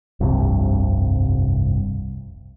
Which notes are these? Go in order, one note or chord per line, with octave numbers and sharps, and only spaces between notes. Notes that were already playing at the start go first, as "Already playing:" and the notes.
F1 C2 G2 C3